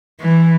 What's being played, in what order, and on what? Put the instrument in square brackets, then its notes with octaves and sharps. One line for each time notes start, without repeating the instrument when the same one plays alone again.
[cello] E3